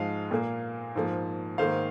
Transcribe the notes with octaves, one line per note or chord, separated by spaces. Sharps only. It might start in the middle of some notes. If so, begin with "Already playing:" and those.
Already playing: G#2 F3 G#3 F5
A#2 A#3
G#2 F3 A#3
G#2 D#3 A#3 C5 F5